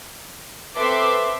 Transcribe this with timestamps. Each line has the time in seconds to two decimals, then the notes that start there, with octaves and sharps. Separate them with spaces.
0.76 C4 A4 B4 E5 C6 D6